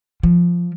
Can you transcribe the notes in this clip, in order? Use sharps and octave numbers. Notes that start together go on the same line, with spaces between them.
F3